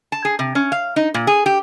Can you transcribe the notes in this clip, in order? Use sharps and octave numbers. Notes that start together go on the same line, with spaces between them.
A5
G#4
C3
C#4
F5
D#4
A#2
G#4
G4